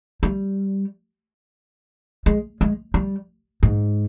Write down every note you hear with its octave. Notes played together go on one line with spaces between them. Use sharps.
G3
G#3
G#3
G3
G#2